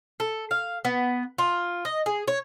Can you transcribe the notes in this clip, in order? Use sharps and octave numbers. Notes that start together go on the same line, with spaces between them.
A4
F5
B3
F4
D#5
G#4
C#5